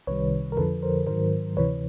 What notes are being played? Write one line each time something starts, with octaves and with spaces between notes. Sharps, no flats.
C2 C3 D#3 G3 B4 C#5
A#4
F2 D3 F3 A4 B4
A#4 C5
G#2 D#3 F#3 A#4 C5
D2 C3 E3 B4 C#5